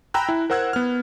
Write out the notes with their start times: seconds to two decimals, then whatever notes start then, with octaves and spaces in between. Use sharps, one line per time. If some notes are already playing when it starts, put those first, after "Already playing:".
0.14 G5 G#5 A#5 B5 E6 F#6
0.29 E4
0.50 A#4 C5 F#5 E6 F#6 G#6
0.73 B3 F6